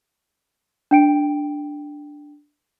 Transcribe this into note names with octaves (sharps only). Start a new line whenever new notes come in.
D4 G5 D7